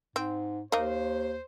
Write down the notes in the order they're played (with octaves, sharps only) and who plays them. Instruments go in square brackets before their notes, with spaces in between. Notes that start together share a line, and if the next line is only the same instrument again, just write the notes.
[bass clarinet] G#2 [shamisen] C4
[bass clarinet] D#2 [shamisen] A#3 D#4 [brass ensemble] C5